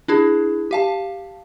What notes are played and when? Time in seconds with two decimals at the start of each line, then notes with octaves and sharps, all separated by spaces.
0.08 D4 E4 G#4
0.71 G4 F5 A5